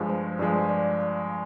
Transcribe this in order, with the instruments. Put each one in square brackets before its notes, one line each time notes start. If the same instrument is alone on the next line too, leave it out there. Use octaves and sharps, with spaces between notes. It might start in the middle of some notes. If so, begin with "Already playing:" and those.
Already playing: [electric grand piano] G2 F3 G#3
[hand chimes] C5
[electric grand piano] G2 F3 G#3 [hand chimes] D5
[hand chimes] D5